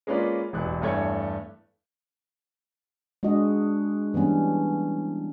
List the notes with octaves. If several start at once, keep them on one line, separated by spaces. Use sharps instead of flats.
G#3 A#3 C#4 F4 B4 D5
E1 A1 F#6
E2 G2 A3 C#5 G#6 C#7
G#3 D4 F#4 D#5
E3 G3 B3 C#4 D4